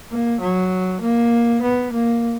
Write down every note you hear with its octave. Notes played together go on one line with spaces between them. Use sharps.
A#3
F#3
A#3
B3
A#3